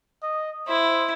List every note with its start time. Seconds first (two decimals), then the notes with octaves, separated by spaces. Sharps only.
0.23 D#5
0.68 E4 C5